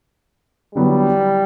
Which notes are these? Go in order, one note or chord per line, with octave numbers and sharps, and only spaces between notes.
D3 F#3 G3 B3 E4